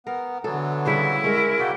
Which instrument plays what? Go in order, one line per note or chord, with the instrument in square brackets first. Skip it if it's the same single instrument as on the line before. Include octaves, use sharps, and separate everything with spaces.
[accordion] B3 [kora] A#4
[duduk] D3 [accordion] E3 F#3 B3 [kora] A4
[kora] C#3 G3 C5 [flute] E4
[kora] G#3 C#4 [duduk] A#4
[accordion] A#3 F#4 [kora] D5 G5